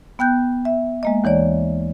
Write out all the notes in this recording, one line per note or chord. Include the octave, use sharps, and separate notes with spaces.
B3 G5 F#6 G6
E5
G#3 A#3 D#5
D#2 E3 C#5 D5